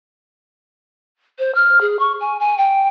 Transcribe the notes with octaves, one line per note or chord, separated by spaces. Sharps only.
C5
F6
G#4
C#6
G#5
G#5
G5